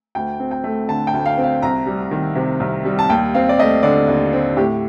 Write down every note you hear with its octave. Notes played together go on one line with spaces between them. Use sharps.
D2 G5
C4
G5
A3
D3 A5
G5
D2
F5
C4
F5
C2 A#5
G3
D#3
C3
C2
G3
A5
D#2 G5
C4 F5
D5
A3 D#5
D3 D5
D#2
C4
A2 G4